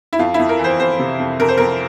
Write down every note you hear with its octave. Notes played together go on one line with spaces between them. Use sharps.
E4
F2 F4
E4
F2
A#4
E3
C5
F2 C5
C3
F2
F2 A#4
C5
F2 A#4